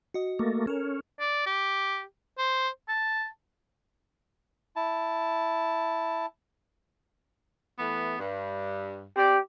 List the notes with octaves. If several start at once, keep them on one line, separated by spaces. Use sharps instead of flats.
F#4 D#5
A3 A#3
C#4 A4 A#4
D5
G4
C5
A5
E4 A5
E3 A3 B3
G2
C4 G4 D5